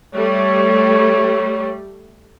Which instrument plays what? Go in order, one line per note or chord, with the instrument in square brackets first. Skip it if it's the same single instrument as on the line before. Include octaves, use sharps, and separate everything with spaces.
[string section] G3 A3 [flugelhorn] C#5